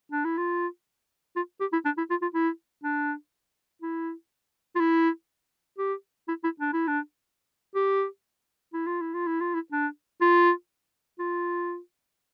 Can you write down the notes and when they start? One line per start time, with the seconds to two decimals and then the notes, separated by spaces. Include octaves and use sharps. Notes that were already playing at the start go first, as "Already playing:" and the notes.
0.12 D4
0.25 E4
0.37 F4
1.36 F4
1.60 G4
1.73 E4
1.85 D4
1.98 E4
2.10 F4
2.22 F4
2.34 E4
2.84 D4
3.82 E4
4.76 F4
4.80 E4
5.78 G4
6.28 E4
6.44 E4
6.60 D4
6.73 E4
6.88 D4
7.75 G4
8.74 E4
8.86 F4
9.01 E4
9.14 F4
9.27 E4
9.41 F4
9.54 E4
9.72 D4
10.21 F4
11.19 F4